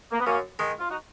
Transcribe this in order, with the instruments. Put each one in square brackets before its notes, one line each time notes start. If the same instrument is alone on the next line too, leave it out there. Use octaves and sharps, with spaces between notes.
[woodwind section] A#3
B3
[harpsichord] F#2 [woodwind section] A#3 C#4
[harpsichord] D#3 G#3
[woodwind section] F4
D#4 F#4